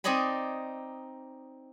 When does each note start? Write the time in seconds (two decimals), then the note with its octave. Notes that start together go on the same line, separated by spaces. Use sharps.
0.04 C4 D#4 D5 D#5 G#5 B5